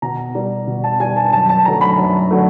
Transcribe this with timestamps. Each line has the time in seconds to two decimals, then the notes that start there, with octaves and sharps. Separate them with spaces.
0.02 B2 A#5
0.35 G3
0.67 B2
0.84 A5
1.00 G3 G#5
1.17 A5
1.32 F#2 A5
1.49 A5
1.65 D3 F#3 A3 A#5
1.81 B5
1.98 F#2
2.31 D3 F#3 A3